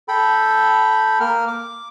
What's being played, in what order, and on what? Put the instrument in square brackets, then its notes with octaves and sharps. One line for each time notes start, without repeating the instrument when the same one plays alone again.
[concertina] A4 G5 B5
A#3 A#4 F6
D6